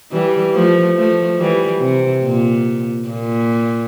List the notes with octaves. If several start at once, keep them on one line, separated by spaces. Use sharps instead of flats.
E3 G3
F3 A3
F3 A3
E3 G3
C3
A#2
A#2